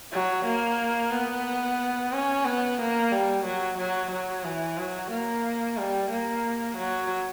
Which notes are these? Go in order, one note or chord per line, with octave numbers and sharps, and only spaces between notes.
F#3
A#3
B3
C#4
B3
A#3
G3
F#3
F#3
F#3
E3
F#3
A#3
G3
A#3
F#3